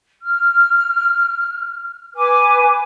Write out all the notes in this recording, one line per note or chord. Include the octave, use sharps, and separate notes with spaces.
F6
B4 G#5 D6